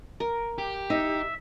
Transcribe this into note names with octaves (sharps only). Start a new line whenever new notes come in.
A#4
G4
D#4 E5